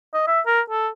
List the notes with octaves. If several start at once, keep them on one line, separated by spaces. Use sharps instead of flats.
D#5
E5
A#4
A4